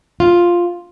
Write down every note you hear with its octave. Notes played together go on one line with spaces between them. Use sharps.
F4